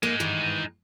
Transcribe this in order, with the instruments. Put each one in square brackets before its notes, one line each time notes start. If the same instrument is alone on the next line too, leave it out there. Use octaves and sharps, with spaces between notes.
[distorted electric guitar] G#3 D#4 [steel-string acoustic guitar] A#3
[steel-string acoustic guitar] G2 D#3 E3